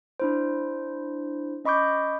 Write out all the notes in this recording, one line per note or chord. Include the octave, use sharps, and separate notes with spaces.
D4 E4 C5
C#4 D#5 B5 C#6 D6 G6